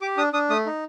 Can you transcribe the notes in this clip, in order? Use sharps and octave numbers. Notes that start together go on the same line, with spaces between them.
G4 D6
D4 D#6
D4 D#6
A3 D#6
D#4